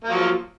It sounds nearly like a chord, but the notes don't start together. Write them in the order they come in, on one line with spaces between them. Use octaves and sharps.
A#3 F3 F#3